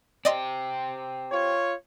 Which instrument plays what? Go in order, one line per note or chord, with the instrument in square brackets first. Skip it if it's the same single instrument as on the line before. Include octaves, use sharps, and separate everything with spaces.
[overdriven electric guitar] C4 G4 [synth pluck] D5 D#5 C6
[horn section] F4 C#5